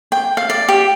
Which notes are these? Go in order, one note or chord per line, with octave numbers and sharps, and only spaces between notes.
G5
F5
D5
G4